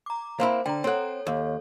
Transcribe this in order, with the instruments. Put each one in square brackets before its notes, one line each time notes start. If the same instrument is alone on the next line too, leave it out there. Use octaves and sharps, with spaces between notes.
[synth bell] A#5 D6
[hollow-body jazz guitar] A#3 C4 E4 [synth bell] C5
[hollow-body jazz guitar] D3 [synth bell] G5 A#5
[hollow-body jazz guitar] C4 F#5 [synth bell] A4 C#5
[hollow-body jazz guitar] D#2